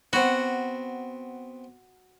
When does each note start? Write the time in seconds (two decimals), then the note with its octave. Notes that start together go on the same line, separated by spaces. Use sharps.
0.13 B3 C4 F#4